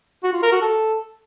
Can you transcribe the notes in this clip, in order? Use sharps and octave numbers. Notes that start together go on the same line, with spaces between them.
F#4
F4
A#4
F#4
A4